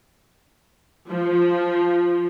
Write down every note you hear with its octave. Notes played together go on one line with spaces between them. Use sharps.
F3